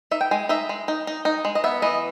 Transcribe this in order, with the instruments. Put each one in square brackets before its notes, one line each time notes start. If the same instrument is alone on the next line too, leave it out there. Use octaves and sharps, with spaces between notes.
[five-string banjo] D#4 E5
G5
G#3 G#5
D#4 E5
G#3
D#4
D#4
D#4
G#3
D#5
B3 E5
E3 D#5